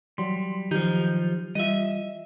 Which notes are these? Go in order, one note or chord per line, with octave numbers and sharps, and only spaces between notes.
E3 F#3 G3 C6
D#3 F3 D#4 G4 G6
E3 G3 F4 D#5 E5